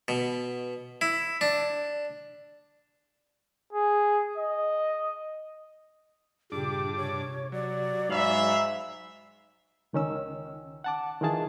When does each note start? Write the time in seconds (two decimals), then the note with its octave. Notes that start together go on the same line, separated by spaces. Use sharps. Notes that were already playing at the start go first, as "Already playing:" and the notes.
0.08 B2
1.01 E4
1.41 D4
3.73 G#4
4.37 D#5
6.52 G2 A#2 C#3 D4 G4 D6
6.97 C3 C#5
7.52 F#3 D5
8.10 G#2 E5 F5 A#5 B5
9.93 C#2 D#3 C#4 E6
10.84 F#5 A5 D6
11.21 D#3 E3 F4 G#4 A5